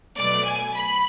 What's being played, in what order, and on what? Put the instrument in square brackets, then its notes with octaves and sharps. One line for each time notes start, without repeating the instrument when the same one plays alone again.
[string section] B2 F#3 A3 D5
G#5
B5